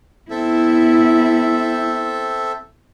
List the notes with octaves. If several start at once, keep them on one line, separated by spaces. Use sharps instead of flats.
B3 C4 E4 A4 E5